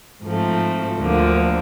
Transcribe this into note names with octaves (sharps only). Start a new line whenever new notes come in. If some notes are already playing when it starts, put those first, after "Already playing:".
G#2 F3 A3 C4
D2 D3 F3 A#3